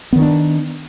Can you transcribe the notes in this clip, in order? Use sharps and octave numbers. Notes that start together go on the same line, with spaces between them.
D#3 B3 C#4 D4